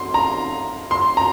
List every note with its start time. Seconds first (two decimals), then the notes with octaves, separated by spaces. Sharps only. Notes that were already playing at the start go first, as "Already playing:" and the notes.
Already playing: C6
0.14 A#5
0.91 C6
1.17 A#5